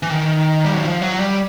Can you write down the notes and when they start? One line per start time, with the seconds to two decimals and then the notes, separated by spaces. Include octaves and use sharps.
0.03 E3
0.10 D#3
0.65 G3
0.74 F#3
0.82 F3
1.02 F#3
1.20 G3